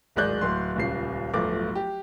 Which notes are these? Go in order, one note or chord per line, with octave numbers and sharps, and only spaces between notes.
D1 G#1 G#3 D5 F#6 G6
D1 C6
D#1 C#2 C7
D1 G1 F3 A3 D6
G4